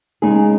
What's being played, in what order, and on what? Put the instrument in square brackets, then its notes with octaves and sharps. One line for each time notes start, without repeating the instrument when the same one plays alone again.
[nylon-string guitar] C#3 G#3 D#4 G#4